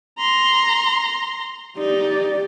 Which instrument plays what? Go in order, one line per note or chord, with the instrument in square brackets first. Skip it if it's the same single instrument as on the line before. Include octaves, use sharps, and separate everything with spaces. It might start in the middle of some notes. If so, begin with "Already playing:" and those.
[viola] A#5 C6
[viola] D#4 [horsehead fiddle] G4 D5